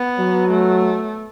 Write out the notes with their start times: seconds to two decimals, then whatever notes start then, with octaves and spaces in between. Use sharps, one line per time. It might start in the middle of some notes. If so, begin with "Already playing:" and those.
Already playing: B3
0.18 F#3
0.50 A3